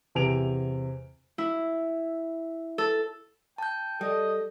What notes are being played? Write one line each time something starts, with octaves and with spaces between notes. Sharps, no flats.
E2 C3 G#5 D7 F7
E4
A4
G5 A5 G6
G3 A4 D5 D#5